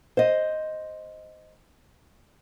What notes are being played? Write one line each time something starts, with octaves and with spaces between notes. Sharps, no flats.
C5 D#5